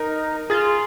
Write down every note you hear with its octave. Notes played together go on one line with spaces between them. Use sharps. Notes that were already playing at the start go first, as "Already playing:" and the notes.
Already playing: D#4 A#4
F4 G#4